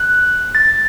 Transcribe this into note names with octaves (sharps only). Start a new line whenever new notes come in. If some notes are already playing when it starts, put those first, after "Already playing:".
Already playing: F#6
A6